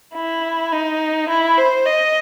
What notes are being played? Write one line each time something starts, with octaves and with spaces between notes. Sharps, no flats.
E4
D#4
E4
C5
D#5